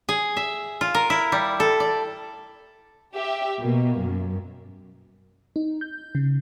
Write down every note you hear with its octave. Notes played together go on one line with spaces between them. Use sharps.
G#4
E5
F4
A#4
E4
G3
A4
D5
G4 E5
B2 A#3
F#2
D#4
G6
C#3